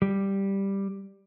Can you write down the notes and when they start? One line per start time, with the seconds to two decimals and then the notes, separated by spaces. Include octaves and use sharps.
0.02 G3